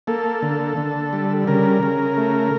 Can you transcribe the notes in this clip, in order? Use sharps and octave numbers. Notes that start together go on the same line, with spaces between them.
A#3 A4
D3
D3
G3
C#3 A#4
C#3
A3